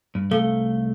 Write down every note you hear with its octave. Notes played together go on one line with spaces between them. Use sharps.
G2
C2 A3 A4 F5 G7